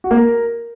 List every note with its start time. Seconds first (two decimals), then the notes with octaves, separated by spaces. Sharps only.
0.04 F#4
0.11 A#3
0.17 A#4